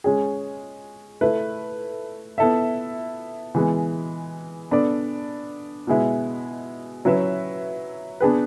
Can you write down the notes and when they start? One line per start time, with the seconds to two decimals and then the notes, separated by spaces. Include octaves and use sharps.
0.04 G#3 C#4 G#4
1.21 A3 E4 B4
2.38 B3 E4 A4 E5
3.55 E3 G#3 B3
4.71 B3 D4 A4 D5
5.87 B2 G#3 B3 E4
7.05 F#3 C#4 E4 B4 E5
8.20 B3 D4 G#4 B4